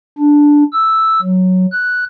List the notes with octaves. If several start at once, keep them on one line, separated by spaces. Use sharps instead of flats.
D4
E6
F#3
F#6